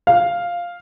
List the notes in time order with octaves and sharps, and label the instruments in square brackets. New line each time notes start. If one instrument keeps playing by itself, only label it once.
[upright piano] F5